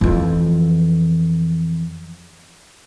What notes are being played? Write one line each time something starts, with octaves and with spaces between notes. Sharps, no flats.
F2 E3